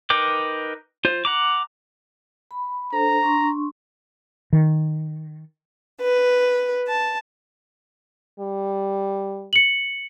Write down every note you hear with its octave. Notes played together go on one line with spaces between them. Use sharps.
D#4 A#4 B4 G5 D6
F4 C5
F#5 A#5 D6
B5
D4 A4 C5 A#5
D4 C6 C#6
D#3
B4
A5
G3
C#7 F#7